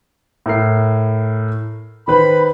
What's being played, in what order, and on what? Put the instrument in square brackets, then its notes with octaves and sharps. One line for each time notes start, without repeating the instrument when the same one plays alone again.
[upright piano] A2 A#4 C7
[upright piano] D#3 B4 C5 [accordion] B5